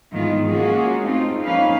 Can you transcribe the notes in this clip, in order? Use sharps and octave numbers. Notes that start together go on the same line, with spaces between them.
G#2 D#3 E3 G#3 B3 F4
G#3 A#3 C#4 F4 F#4 G#4
A3 C4 D#4 F4
F3 A#3 C#4 D#4 B4 F5